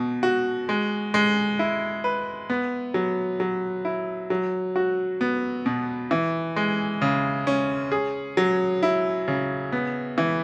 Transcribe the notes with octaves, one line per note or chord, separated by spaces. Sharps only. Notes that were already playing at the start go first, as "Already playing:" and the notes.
Already playing: B2
F#4
G#3
G#3
E4
B4
B3
F#3
F#3
E4
F#3
F#4
B3
B2
E3
G#3
C#3
C#4
G#4
F#3
E4
C#3
B3
E3